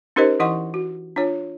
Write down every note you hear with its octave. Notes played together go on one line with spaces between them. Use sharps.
C#4 D#4 G4 A#4 C5 D#5
E3 E4 D#5 F#5 C6 C#6
F#4
D4 F4 C#5